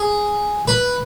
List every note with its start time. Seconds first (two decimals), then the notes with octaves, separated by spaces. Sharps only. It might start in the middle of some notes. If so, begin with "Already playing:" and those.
Already playing: G#4
0.68 B4